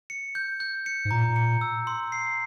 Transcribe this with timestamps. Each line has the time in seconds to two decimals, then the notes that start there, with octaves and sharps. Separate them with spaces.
0.10 C#7
0.35 G6
0.60 G6
0.86 C#7
1.05 G#2
1.11 A#2 A#5
1.36 C#7
1.61 E6
1.87 C6
2.12 C7